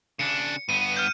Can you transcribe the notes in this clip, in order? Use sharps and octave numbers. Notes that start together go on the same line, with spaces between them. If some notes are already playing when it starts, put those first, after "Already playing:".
C#3 D4 C#7
G2 B3 D#7
F6 G6